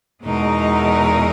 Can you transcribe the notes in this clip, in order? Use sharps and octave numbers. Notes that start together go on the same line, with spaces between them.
E2 B2 G#3 D#4 A#4